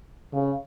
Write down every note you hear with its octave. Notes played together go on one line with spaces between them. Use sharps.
C#3